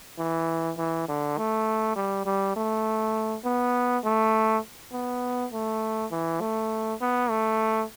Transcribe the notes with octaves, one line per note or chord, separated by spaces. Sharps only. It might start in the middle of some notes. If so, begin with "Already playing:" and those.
E3
E3
D3
A3
G3
G3
A3
B3
A3
B3
A3
E3
A3
B3
A3